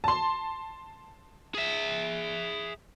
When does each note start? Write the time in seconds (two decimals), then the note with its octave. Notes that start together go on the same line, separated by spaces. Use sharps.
0.04 A5 C6
1.54 G#4 E5